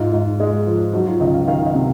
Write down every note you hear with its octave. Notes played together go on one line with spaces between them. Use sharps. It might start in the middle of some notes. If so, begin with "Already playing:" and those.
Already playing: G#2 F4
G#2
G#3
F3
F#3 D#4
F4
C#2 D#5
F5
D#3 F5
D#5
C3